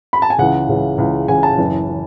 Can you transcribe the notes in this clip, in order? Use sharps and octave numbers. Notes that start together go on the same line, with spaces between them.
B5
A5
G#5
C#2 C#3 E3 F#5
C#2 C#3 E3
C#2 C#3 E3
C#2 C#3 E3 G#5
A5
F#1 F#2 E3
E3